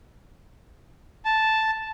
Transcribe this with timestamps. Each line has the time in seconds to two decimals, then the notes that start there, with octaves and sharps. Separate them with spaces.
1.25 A5